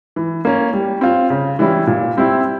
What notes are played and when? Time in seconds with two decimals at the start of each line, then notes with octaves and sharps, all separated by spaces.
0.16 E3
0.45 A#3 C#4
0.73 G3
1.01 C4 F4
1.30 C#3
1.59 E3 G3 C#4 E4
1.87 A#2
2.17 G3 C4 E4